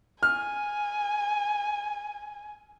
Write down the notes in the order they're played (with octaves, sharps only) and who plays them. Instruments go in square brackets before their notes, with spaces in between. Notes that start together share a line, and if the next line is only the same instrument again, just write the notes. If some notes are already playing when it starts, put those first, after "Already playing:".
[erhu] G#5 [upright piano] F6